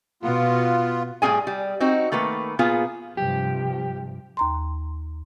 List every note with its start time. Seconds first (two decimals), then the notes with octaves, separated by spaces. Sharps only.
0.23 B2 B3 F4
1.22 A2 G3 C#4 G#4 G#5
1.47 G3
1.80 C4 D#4 F#4
2.12 D#3 A3 A#3 B4
2.59 A#2 B3 F4 G#4
3.17 G2 C3 F3 G4
4.37 D#2 A#5 C6